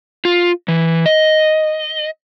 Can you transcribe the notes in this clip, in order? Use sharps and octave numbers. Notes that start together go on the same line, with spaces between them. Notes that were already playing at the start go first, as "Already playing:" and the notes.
F4
E3
D#5